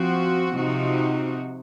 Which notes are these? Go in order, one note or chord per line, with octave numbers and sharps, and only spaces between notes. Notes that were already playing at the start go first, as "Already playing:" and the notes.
Already playing: F3 C4 F#4
C3 F3 C4 D#4 F#4